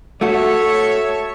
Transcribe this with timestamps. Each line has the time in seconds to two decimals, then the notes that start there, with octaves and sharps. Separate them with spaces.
0.21 A3 F#4 A4 C#5 E5